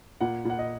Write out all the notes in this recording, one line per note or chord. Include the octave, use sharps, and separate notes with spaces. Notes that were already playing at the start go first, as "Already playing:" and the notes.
A#2 F#5
A#2 F#5
D#5